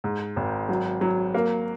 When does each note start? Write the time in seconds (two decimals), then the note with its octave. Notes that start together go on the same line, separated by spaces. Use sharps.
0.04 G#2
0.36 G#1
0.69 F#3
1.01 F#3
1.35 A#3